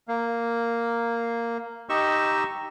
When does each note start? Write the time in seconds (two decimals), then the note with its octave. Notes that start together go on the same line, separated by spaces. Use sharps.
0.08 A#3
1.89 D#4 G4 D#5 C#6 E6